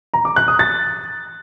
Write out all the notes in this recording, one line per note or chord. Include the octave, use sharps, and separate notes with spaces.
A#5
D6
F#6
D#6
A6